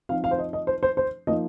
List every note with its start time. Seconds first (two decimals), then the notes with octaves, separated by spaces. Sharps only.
0.09 F3 C4 D#4 F5
0.24 F5
0.31 C5
0.39 D#5
0.53 D#5
0.67 C5
0.83 C5
0.97 C5
1.27 F3 A#3 D#4 D#5